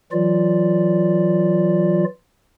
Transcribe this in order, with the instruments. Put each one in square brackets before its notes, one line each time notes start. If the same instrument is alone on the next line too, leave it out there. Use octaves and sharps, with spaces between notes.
[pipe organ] E3 F#3 F4 D5